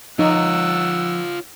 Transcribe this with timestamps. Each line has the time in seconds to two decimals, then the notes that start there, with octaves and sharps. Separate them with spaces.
0.19 F3 D#4 F4 C#5 F#5 E6